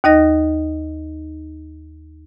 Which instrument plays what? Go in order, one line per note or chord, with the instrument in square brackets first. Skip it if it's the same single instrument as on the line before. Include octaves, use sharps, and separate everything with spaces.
[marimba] D#2 D#4 D#5 A#6